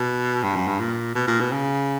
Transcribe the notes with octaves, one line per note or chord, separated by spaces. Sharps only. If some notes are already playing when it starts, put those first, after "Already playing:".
Already playing: B2
G2
F#2
G2
A#2
B2
A#2
B2
C#3